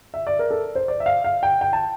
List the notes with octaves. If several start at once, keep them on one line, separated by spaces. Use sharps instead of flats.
E5
D5
A#4
A4
C5
D5
E5
F5
F5
G5
G5
A5